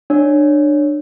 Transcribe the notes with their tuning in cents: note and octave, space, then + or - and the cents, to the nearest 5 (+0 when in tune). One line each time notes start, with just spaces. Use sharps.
D4 +25 C#5 +0